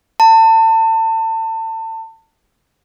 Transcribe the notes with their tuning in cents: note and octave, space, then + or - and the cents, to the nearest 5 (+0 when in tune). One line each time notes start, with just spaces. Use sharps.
A5 +30